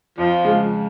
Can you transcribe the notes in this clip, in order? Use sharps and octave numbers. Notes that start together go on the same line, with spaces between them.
F2 F3
C#3 G#3